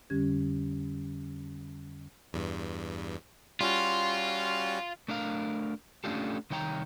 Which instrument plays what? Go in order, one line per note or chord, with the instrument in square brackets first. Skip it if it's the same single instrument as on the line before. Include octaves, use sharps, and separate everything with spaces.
[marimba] F2 D3 G3 C#4 G4 G#6
[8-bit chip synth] E2 G2
[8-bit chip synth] G3 C#4 F#4 [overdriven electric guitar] F4
[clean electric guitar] A3 D4 A#4 F5
A3 C#4 D4 F4 G4 A4
C2 D#3 C#5 G5 A#5